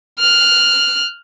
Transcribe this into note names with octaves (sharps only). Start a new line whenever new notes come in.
F6 F#6